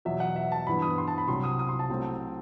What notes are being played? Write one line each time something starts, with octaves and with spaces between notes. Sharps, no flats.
E2 B2 F#3 E5
F#5
E5
A5
G2 E3 B3 B5
D#6
C6
A5
B5
C2 C3 F#3 C6
D#6
D#6
C6
A5
C2 C3 F#3 A3 C4